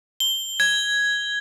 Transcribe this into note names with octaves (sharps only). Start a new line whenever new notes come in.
G7
G#6